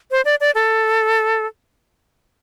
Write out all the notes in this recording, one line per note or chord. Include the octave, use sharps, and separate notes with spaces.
C5
D5
D5
A4